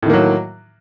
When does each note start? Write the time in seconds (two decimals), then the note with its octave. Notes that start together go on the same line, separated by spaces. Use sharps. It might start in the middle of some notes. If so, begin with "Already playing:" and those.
0.03 A2
0.06 D#3
0.10 A#3
0.13 F#3